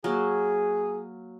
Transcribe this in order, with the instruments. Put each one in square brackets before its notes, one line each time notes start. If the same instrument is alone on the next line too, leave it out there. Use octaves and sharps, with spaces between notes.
[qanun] F#3 A#3 [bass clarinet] G#4